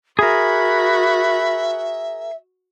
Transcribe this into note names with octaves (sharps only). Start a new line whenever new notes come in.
F#4 G#4 A#4 E5 B5